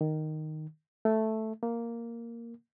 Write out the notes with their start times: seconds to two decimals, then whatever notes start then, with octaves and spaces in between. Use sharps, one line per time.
0.01 D#3
1.05 A3
1.63 A#3